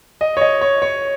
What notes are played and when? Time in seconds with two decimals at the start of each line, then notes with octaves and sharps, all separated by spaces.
0.21 D#5
0.37 C#5
0.41 D#5
0.61 C#5
0.82 C#5